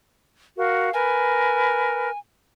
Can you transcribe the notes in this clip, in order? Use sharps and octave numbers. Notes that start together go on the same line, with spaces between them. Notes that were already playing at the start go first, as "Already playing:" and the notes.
F#4 A#4 F5
A#4 B4 G#5